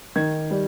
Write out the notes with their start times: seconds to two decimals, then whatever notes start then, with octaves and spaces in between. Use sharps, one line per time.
0.16 D#3 G#6
0.50 G3